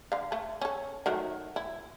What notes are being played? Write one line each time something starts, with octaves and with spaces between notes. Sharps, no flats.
D3 F5
A3
C#4 A4
D#3 F#3 A3
E4